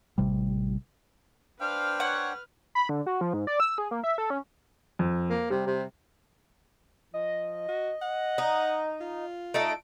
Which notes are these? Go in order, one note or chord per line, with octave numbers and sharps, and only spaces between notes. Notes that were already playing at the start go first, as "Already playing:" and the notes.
A1 C3 G3
D4 B4 C5 F5 G5 F6
C#5 F#5
B5
D3
F#4
F3
G#2
D5
E6
G#4
A#3
E5
A4
C#4
F2
A#3
C3 G3
C3
F3 D#5
F#4
F#5
D#4
F4
A3 D#4 A4 D7